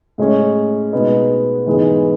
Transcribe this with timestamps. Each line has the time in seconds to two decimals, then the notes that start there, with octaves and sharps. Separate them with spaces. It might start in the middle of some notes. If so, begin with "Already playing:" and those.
0.18 A2 G#3 C#4
0.93 B2 G#3 B3 D#4
1.66 G#2 E3 G#3 B3